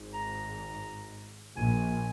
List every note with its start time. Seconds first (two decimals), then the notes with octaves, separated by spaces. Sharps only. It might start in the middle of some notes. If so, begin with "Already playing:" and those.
Already playing: G#1 G#2
0.14 A#5
1.56 A#1 A#2 G#5